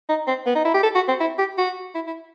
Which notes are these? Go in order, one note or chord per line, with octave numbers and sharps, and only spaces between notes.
D#4
C4
B3
D#4
E4
G4
A4
F#4
C4
E4
G4
F#4
E4
E4